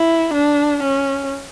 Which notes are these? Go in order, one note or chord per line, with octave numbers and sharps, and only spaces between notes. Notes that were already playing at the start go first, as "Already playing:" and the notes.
Already playing: E4
D4
C#4